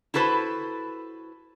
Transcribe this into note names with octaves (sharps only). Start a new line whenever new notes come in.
E4 F#4 A4 B4 C5